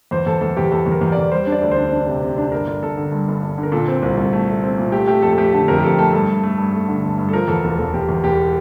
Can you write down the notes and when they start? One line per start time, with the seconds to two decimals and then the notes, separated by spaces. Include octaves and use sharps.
0.11 E2 C5
0.26 E2 A4
0.41 E2 A4
0.57 E2 G4
0.71 E2 A4
0.86 E2
0.92 A#4
1.01 E2
1.12 E2 D5
1.31 G3 C5
1.47 D4
1.52 D5
1.61 D2
1.71 D4 C5
1.92 D4
2.07 C3
2.22 C3
2.38 D4
2.52 G1 A#4
2.67 G1
2.82 G1 A4
2.97 D3
3.12 G2
3.28 G1
3.42 G1
3.58 D3
3.63 A#4
3.72 A#2 A4
3.88 C4
4.02 C2
4.17 C2
4.33 A3
4.48 A3
4.63 C4
4.78 A#2
4.92 A3 G4
5.07 A3 G4
5.22 F2 A4
5.33 A4
5.38 A3 G4
5.53 D3 A4
5.68 F2 A#4
5.78 G4
5.83 F2 A4
5.98 A3 A4
6.13 G2 A4
6.29 G2
6.43 A3
6.58 G2
6.73 A3
6.88 D3
7.03 G1
7.18 G2
7.29 A4
7.33 F3 A#4
7.48 E2 A4
7.64 E1
7.78 E1 A4
7.93 E1 G4
8.09 E2
8.24 E1 G4